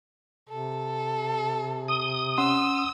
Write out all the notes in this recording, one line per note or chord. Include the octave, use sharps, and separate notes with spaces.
C3 A4
D#6
C#4 F#5 C6 E6